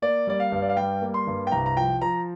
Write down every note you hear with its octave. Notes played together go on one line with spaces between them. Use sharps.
A#3 D5
G3 D5
F5
G2
D5
F5
G3 G5
A#3
C6
G2
G5
C2 A#5
A#5
F3 G5
F3 A#5